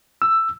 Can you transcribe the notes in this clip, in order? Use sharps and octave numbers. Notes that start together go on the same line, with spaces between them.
E6